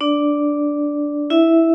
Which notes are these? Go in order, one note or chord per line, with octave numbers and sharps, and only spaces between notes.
D4 D5
E4 E5